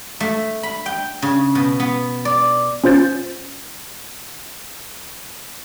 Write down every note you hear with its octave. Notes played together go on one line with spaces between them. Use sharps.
A3
B5
G5
C#3
B2
B3
D5
C#4 F4 C5 G6 A6